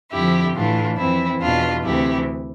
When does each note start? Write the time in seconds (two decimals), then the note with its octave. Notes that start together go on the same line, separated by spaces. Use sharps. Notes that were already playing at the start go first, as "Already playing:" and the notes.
0.12 F2 D3 F3 E4 G4
0.55 A2 E3 D4 F4
0.97 F2 E3 C4 E4
1.40 E2 B2 D4 F4
1.84 D2 C3 E3 E4 G4